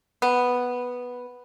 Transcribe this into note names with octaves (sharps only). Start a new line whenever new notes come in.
B3